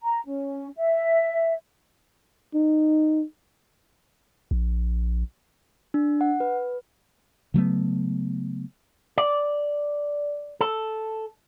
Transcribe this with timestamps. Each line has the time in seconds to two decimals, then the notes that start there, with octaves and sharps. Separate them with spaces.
0.01 A#5
0.27 C#4
0.77 E5
2.54 D#4
4.51 A#1
5.94 D4
6.21 F#5
6.40 B4
7.54 C#3 F#3 A3 B3
9.18 D5
10.61 A4